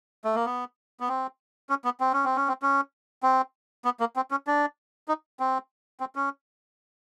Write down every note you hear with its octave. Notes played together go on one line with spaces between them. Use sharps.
A3
A#3
B3
B3
C4
C#4
B3
C4
C#4
C4
C#4
C4
C#4
C4
B3
A#3
C4
C#4
D4
D#4
C4
C4
C#4